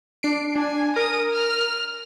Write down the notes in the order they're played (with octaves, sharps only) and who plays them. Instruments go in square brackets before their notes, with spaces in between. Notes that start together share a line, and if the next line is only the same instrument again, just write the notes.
[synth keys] D4 C7 D7
[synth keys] D4 [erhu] G#5
[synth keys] A#4 A#5 [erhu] D#6
[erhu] F6